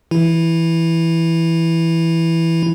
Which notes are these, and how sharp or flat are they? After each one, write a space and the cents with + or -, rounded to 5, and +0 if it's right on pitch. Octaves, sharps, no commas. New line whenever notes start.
E3 +0 E4 +0